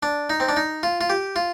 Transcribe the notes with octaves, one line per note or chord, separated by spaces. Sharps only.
D4
D#4
C4
D4
D#4
F4
F4
G4
F4